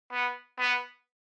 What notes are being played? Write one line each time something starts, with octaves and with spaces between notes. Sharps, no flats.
B3
B3